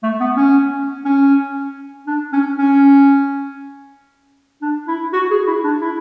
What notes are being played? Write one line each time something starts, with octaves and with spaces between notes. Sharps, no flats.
A3
B3
C#4
C#4
D4
C#4
C#4
D4
E4
F#4
G#4
E4
D4
E4